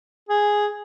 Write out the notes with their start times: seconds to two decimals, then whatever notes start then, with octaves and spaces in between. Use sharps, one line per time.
0.29 G#4